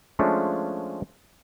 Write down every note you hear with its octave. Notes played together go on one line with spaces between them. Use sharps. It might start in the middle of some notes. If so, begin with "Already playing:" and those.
F3 G#3 A3 C#4 D4 F4